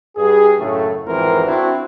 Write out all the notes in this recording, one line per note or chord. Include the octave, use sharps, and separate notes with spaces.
G2 G#4
F#2 A2 C#3 A3
G#1 F2 E3 C4 A#4 C5
C4 D4 E4 F#4